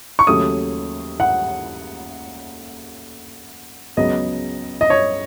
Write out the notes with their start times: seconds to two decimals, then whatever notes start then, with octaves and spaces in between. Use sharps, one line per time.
0.19 C#6
0.27 D#2 C#3 F#3 A3 D#6
1.20 F#5
3.97 C#2 C#3 F#3 B3 D#5
4.81 D#5
4.90 C#5